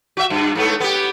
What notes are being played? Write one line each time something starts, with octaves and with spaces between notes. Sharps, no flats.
F#4 E5
G2
G#2 A3 B3
B3 G4